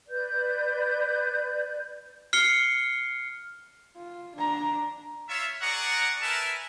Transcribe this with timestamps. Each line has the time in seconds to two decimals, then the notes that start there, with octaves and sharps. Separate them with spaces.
0.08 B4 D5 G6
2.33 F6 C7 C#7 G7
3.97 F4
4.36 D4 A#5
5.28 F4 C#5 E5
5.61 G#4 D5 F#5 A#5 C#6
6.21 A#4 B4 E5 G#5 A5